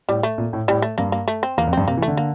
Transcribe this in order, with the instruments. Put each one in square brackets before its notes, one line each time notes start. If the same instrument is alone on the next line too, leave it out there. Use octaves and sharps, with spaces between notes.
[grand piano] A2 [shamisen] G3
[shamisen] A3
[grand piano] A#2
A2
[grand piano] A2 [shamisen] G3
[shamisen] A3
[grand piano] G2 [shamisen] A#3
[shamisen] A#3
A3
C4
[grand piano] E2 [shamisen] A#3
[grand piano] F2
[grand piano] G2 [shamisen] C4
[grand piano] C3 [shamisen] A#3
[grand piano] E3
[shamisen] A3
[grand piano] D3
[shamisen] A#3